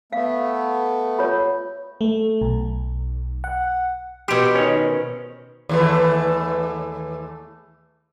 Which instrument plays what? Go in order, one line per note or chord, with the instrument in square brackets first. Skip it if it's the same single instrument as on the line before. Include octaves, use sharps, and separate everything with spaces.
[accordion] A3 B3 [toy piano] F5
[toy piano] F4 C#5
[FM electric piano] A3
B1
F#5
[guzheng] B2 C5 [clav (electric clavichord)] G4
[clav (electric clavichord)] D#3 C#4
[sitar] D#2 E3 A3